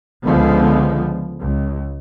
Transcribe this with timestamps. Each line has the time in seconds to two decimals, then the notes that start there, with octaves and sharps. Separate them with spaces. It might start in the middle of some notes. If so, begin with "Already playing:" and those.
0.25 C#2 D3 F3 G#3 B3
1.40 C#2